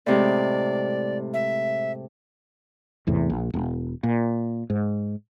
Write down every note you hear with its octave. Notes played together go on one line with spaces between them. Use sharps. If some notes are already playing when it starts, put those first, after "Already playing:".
A2 C3 G#3 D5
E5
G#1 E2 A2 C3
A#1
E1
A#2
G#2